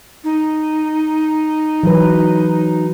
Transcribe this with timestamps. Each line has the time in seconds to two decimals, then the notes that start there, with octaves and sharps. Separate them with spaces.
0.24 D#4
1.83 E3 F#3 B4